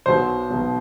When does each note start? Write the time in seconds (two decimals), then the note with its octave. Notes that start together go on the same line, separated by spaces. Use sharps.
0.06 B1 B2 F#3 C5
0.50 B1 B2 F#3